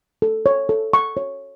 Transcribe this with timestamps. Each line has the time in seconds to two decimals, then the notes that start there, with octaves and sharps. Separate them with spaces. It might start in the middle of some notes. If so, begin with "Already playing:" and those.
0.22 A4
0.46 C#5
0.69 A4
0.93 C#6
1.17 C#5